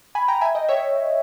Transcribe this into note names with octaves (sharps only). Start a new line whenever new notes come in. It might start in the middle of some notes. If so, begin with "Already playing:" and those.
G#5 B5
G5 A#5
E5 G#5
D#5 G5
C#5 E5